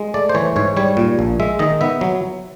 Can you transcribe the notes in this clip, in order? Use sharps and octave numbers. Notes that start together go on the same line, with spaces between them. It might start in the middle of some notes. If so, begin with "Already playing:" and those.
Already playing: G#3
A3 D5
C5
E3 C#5
G#2 C#5
G3 C#5
A#2
A#1
G#3 E5
D#3 D#5
B3 E5
F#3